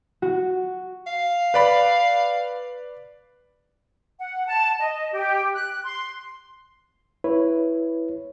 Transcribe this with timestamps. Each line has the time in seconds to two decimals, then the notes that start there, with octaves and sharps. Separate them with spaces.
0.22 F#4
1.07 F5
1.54 B4 D5 B5
4.19 F#5
4.47 A5
4.79 D#5
5.13 G4
5.54 F#6
5.84 C6
7.24 E4 B4 C#5